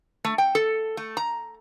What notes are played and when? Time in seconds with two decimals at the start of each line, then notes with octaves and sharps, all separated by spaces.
0.25 A3
0.38 G5
0.55 A4
0.97 A3
1.17 A#5